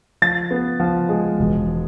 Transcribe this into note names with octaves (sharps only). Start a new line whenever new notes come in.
F3 A6
B3
F3
G#3
E1